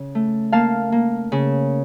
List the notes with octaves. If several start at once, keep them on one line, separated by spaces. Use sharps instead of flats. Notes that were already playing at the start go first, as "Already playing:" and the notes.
Already playing: C#3
A3
A#3 F5 A5
A#3
C#3